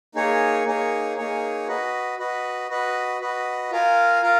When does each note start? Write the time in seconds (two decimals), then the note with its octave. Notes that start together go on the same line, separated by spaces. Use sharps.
0.15 A#3 D#4 G#4 C#5
0.65 A#3 D#4 G#4 C#5
1.17 A#3 D#4 G#4 C#5
1.67 F#4 B4 D#5
2.19 F#4 B4 D#5
2.69 F#4 B4 D#5
3.20 F#4 B4 D#5
3.71 F4 A#4 F5 G#5
4.22 F4 A#4 F5